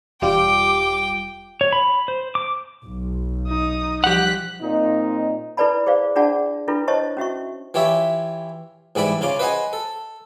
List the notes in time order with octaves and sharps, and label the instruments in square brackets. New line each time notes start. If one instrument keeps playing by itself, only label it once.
[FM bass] E1 [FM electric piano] G3 F4 G4 [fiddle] G5 [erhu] D6
[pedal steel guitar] C#5
B5
C5
D6
[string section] B1
[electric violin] D#4 D#6
[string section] F3 G3 F#6 [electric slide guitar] G4 F#5 [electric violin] B6
[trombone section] A#2 C4 D#4
[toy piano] E4 A4 B4 D5 A5 B5
G#4 C5 D5 F5
D4 F4 G#4 D5 F#5 A5
D4 E4 F4 A4 B4
C5 C#5 D#5 A5 C#6
C#4 F#4 E5 C#6
[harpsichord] E3 F4 G4 C#5 E5
G#2 E3 G3 E4 D5 B5
C#3 C#4 F4 D6
B4 C5 D#5 F#5 G#5
A4